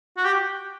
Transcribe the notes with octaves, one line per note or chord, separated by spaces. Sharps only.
F#4
G4